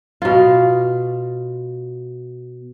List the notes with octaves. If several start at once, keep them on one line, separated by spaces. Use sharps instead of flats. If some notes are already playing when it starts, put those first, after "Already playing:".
B2 F4